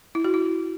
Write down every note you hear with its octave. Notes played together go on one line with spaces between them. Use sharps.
E4
F#4
E4